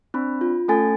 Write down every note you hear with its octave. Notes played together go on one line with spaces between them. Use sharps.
C4 D4 B5
F4
A3 C#4 A4 G#5 A6